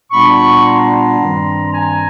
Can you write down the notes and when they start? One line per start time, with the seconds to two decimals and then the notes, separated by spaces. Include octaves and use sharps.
0.12 A#2 G3 B3 D4 B5 C#6
0.65 A#5 C6
1.19 G2 D#3 G3 C4
1.72 G#5 A#5